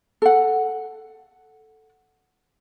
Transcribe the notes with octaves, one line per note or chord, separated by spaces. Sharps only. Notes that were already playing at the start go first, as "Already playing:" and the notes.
A4 F#5